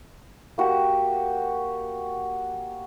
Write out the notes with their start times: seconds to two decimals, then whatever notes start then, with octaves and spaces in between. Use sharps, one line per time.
0.58 A#3 F#4 G4